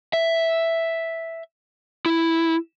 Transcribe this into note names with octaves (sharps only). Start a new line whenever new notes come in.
E5
E4